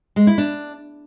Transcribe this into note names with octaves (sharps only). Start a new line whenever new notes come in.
G#3
E4
D4